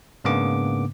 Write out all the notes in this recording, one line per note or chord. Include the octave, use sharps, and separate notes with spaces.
G#2 C#3 A#3 B3 D4 D6